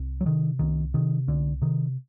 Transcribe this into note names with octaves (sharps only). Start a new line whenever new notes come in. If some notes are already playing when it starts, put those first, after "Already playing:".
Already playing: C2
F#3
C3 D#3
C2 D#3
C3 D#3
C2 D3
C3 D#3